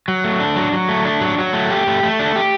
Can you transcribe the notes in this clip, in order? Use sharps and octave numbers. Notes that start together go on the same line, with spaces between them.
F#3
A3
D4
F#3
F#3
A3
D4
F#3
F#3
A3
G4
A3
A3
D4
G4